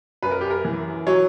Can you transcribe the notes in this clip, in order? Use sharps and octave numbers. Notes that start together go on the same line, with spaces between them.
F#2 B4
A#4
G4
A#4
E3
F#3 C#5